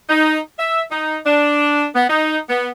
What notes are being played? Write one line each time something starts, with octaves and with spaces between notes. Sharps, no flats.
D#4
E5
D#4
D4
B3
D#4
B3